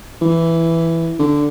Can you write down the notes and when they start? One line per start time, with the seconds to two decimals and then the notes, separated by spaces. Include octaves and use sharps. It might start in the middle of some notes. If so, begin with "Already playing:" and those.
0.21 E3
1.19 D3